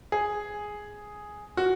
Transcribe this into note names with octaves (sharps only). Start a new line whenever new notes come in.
G#4
F#4